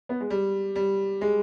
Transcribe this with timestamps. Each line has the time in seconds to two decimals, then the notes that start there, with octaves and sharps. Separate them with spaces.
0.09 B3
0.20 G#3
0.30 G3
0.76 G3
1.21 G#3